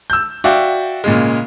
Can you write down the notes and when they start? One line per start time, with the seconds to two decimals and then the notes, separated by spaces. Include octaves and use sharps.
0.10 E6 G6
0.44 F#4 D5 E5 F5 G5
1.04 A#2 C#3 G#3